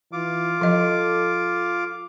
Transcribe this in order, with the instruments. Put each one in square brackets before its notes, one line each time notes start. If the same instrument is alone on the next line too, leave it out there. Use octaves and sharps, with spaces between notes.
[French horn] E3 [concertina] F4 D6
[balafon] F3 D#5 [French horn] A4